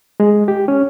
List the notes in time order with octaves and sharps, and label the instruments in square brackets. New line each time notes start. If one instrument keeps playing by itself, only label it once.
[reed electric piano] G#3
G4
C#4